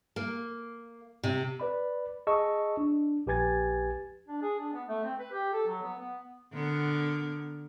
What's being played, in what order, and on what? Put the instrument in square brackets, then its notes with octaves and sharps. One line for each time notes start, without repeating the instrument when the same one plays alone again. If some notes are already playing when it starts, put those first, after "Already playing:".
[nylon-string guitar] A#3
C3
[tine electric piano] B4 D5 B5
G#4 D#5 A5 C#6 E6
D4
A#1 G4 B4 G#5 G#6 A6
[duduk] D4
G#4
D4
B3
A3
C4
B4
G4
A4
F#3
B3
B3
[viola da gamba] D3 B3 A#4